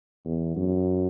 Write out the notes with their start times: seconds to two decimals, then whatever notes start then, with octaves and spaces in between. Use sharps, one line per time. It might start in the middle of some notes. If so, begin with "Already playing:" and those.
0.25 E2
0.56 F#2